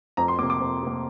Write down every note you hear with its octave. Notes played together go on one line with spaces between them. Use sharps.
F2 A#5
C6
C3 A#3 D6
D6
F2
C3 A#3